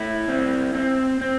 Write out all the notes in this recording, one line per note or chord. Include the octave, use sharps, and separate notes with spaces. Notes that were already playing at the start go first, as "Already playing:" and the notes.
Already playing: A3 E4
C4
C4
C4